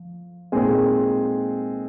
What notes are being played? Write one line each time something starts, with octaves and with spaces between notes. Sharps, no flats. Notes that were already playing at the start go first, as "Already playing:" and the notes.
Already playing: F3
A#2 G#3 C4 D#4 G#4